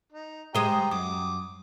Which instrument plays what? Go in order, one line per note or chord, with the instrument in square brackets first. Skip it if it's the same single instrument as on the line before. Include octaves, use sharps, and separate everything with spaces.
[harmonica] D#4
[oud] G#3 C5 D#5 [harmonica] G4 G5 A#5
[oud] F#2 [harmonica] D6 D#6